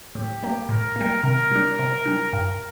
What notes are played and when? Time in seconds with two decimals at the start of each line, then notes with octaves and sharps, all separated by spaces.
0.15 A2 G4
0.43 G3 A#3
0.69 A2 A#4
0.96 G3 A#3
1.23 C3 A#4
1.51 G3 D4
1.79 C3
2.06 G3 D4
2.33 G2